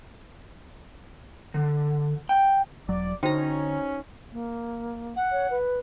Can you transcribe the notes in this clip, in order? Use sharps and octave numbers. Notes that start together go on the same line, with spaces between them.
D3
G5
E1 F#3 D5
D3 C#4 D#4 F#4 C5 G5 A#5
A#3
F#5
C#5
B4